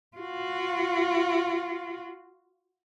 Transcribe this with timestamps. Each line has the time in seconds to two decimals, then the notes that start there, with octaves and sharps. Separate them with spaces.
0.17 F4 F#4